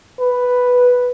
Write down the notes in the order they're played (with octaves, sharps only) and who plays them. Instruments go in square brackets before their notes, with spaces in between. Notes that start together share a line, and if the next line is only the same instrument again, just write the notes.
[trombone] B4